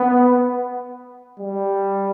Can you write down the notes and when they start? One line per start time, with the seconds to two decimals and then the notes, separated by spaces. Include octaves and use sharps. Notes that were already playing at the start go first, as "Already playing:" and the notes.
Already playing: B3
1.40 G3